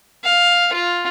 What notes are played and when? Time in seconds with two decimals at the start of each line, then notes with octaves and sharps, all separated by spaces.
0.24 F5
0.73 F4